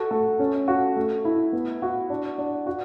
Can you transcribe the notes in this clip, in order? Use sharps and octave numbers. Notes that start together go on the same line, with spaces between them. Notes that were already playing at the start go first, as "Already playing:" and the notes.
Already playing: F#4 A4
A3
C#4
F#4
A3
E4
B3
F#4
D4
D4
F#4